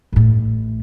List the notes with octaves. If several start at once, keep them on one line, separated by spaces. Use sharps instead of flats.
A1 A2